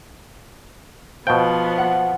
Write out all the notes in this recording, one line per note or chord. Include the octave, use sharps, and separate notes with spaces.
B2 F3 B3 C5 F5 G5 A5
F#5